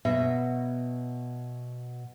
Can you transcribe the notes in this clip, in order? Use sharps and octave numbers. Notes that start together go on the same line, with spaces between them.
B2 F#3 E5